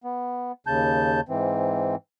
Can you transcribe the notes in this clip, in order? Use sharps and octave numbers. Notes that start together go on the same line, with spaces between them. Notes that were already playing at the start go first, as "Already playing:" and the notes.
B3
D#2 C#3 A5 G6
G#2 E3 C4